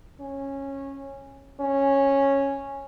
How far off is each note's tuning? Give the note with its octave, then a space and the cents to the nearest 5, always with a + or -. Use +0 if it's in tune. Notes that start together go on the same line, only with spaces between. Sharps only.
C#4 -15
C#4 -10